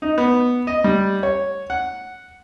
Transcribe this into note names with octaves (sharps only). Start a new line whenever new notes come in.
D#4
B3
D#5
G3
C#5
F#5